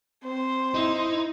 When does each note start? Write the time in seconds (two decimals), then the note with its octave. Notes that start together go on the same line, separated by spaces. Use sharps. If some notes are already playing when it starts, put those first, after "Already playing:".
0.24 C4 C5
0.74 D#4 E4